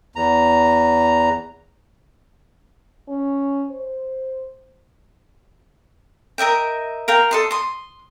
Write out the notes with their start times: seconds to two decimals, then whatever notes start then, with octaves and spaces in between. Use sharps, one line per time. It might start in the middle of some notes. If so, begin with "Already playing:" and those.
0.16 E2 A#5
3.08 C#4
3.70 C5
6.38 A#4 D#5 E5 G5
7.08 A#4 F5 G5
7.31 A4 D#5 C6
7.51 C6 D#6